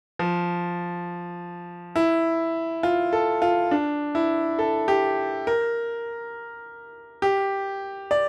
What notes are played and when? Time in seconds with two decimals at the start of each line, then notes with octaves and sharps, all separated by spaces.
0.19 F3
1.96 E4
2.83 F4
3.13 A4
3.42 F4
3.71 D4
4.15 E4
4.59 A4
4.88 G4
5.47 A#4
7.22 G4
8.11 D5